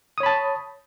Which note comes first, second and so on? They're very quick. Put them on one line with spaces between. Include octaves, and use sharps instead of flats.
D#6 C#5 B5 A5